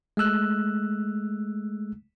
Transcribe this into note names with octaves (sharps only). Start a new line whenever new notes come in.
G#3 A3 E6 F#6